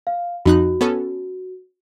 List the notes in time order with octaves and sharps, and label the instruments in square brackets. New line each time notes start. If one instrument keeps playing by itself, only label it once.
[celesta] F5
[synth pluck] F2 D#4 F#6 [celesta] F#4
[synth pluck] B3 C#4 A4